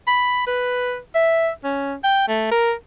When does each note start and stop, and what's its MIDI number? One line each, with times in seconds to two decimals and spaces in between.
0.07 0.46 83
0.47 0.97 71
1.15 1.50 76
1.64 1.95 61
2.04 2.27 79
2.28 2.46 57
2.51 2.73 70